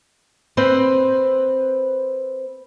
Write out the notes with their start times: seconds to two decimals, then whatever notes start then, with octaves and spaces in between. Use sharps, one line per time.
0.57 C4 B4 C5